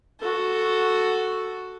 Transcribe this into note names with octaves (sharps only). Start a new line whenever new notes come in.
F#4 A4